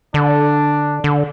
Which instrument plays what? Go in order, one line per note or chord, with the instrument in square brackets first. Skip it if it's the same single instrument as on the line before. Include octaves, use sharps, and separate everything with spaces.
[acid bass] D3 [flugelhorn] D4
[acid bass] D3